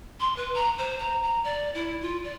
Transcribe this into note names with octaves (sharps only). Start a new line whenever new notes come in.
C6
B4
A#5
C5
A#5
A#5
D5
E4
F4
D5